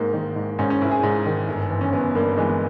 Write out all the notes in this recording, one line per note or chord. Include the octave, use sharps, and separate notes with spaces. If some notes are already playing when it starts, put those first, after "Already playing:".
Already playing: G#1 G#2 A#3
D#3
G#2
G#2 C#4
C#4
G#1 E4
G#4
G#2
D#3
G1
E3
C#4
G1 B3
G2 A#3
E3 G#3